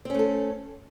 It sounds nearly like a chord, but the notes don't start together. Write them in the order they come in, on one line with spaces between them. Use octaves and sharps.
C4 C#4 A3 A4